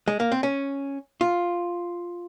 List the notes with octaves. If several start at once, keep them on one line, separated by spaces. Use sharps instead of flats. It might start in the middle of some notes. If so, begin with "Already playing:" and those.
G#3
A#3
C4
C#4
F4